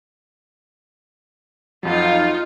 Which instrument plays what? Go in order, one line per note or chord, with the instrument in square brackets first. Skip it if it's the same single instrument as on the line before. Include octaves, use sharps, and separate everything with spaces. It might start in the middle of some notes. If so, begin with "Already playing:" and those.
[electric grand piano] F2 F#3 [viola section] D#4 F4